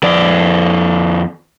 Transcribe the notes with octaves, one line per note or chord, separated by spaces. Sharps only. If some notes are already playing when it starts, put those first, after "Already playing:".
F2 D5